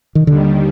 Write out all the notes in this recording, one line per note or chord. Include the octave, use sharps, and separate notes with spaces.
D#3
D#2 D3 D#3 G3